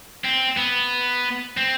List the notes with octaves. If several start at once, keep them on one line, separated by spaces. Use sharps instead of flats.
C4
B3
C4